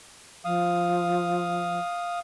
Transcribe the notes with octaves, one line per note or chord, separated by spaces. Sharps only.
F3 F5 D#6